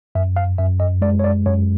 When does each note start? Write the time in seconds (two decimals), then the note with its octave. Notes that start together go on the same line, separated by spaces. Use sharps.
0.15 F#2 E5
0.36 F5
0.58 F#2 E5
0.80 D#5
1.02 G#3 D5
1.19 C#5
1.24 D5
1.46 F#2 C#5